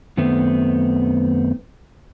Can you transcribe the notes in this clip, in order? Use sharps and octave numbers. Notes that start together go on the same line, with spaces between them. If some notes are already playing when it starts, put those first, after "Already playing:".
F#2 D#3 A3 B3 C4